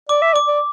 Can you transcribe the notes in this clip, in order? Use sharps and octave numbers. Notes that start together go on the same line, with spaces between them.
D5 D6
E5
D5 D6
D5